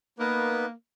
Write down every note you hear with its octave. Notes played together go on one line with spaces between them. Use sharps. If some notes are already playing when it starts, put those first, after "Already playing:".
A#3 B3 D#4 B4